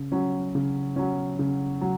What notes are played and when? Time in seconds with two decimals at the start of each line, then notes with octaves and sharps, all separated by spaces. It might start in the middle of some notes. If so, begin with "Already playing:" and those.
Already playing: C#3
0.12 F#3 C#4
0.55 C#3
0.96 F#3 C#4
1.39 C#3
1.81 F#3